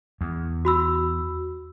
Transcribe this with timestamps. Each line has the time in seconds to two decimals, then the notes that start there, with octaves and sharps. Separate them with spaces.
0.21 E2
0.65 F#4 B5 E6